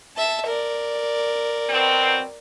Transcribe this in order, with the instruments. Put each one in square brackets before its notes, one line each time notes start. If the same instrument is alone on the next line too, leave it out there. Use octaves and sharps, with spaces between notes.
[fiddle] E5 A5
A#4 D5
[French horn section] B2 F#3 C4